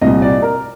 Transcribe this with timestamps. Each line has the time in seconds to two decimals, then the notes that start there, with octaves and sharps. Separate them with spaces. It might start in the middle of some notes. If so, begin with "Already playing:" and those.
0.01 C2 A#2 D#5
0.22 D5
0.42 A#4